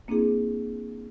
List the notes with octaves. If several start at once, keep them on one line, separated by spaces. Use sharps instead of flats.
A#3 C4 D4 E4 G#4